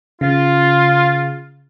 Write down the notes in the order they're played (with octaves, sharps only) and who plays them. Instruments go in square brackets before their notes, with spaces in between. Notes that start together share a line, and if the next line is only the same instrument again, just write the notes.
[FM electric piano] C#3 [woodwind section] F4